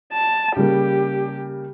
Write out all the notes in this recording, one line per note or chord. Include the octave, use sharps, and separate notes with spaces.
A5
C#3 G3 A#3 G4